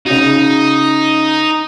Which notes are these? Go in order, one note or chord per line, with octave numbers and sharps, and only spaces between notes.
C#3 D#4 F#4